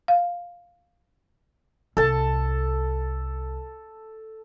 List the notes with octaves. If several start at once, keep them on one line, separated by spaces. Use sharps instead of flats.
F5
C2 A4 A5